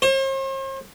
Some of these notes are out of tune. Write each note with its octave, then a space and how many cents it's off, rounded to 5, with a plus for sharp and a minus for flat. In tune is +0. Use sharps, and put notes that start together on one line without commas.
C5 +45